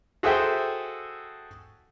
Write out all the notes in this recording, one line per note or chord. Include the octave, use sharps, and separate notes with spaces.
F#4 G#4 A4 C5 E5 G5